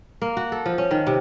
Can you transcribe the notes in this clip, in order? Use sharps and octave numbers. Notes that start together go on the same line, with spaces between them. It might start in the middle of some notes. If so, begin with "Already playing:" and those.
A#3
F#4
A4
F3
C#4
D#3
C3